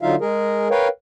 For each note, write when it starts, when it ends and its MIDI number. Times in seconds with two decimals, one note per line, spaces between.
0.02 0.15 50
0.02 0.15 54
0.02 0.15 63
0.02 0.15 65
0.02 0.15 76
0.02 0.15 77
0.21 0.68 56
0.21 0.68 68
0.21 0.68 70
0.71 0.88 70
0.71 0.88 71
0.71 0.88 73
0.71 0.88 77
0.71 0.88 79